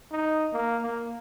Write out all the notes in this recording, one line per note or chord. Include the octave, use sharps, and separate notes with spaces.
D#4
A#3
A#3